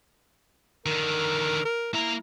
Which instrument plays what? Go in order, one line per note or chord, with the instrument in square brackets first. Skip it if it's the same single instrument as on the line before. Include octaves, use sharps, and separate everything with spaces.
[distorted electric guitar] D3 D#3 [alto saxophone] A#4
[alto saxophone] A#4
[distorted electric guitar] A#3 A#5 [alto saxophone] E4